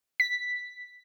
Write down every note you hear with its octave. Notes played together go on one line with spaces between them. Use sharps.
B6